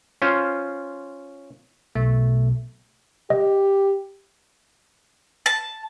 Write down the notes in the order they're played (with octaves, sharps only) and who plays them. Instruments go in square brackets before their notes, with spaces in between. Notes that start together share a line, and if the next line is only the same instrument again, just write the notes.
[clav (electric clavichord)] C#4 F4 C5
[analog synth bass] B1 [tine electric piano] A3
[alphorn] G4 [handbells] D#5
[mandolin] A5